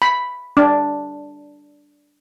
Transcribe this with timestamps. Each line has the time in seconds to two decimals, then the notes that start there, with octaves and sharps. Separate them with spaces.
0.02 B5
0.57 D4